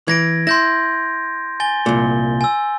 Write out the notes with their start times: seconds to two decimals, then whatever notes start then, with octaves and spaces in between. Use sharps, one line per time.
0.08 E3 G#6 A#6 D7
0.47 E4 C6 G6 A#6
1.60 G#5 A6 G7
1.86 C2 A#2
2.41 G#5 E6